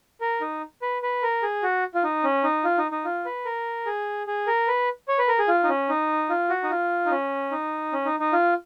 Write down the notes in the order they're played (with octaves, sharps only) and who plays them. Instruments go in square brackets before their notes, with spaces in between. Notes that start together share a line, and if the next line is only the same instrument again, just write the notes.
[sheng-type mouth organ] A#4
D#4
B4
B4
A#4
G#4
F#4
F4
D#4
C#4
D#4
F4
D#4
D#4
F4
B4
A#4
G#4
G#4
A#4
B4
C#5
B4
A#4
G#4
F4
D#4
C#4
D#4
F4
F#4
D#4
F4
D#4
C#4
D#4
C#4
D#4
D#4
F4